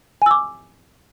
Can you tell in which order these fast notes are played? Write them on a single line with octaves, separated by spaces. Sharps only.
G#5 E6 D6